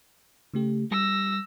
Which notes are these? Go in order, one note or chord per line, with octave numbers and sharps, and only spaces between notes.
C#3 A3 G4
G3 E6 A#6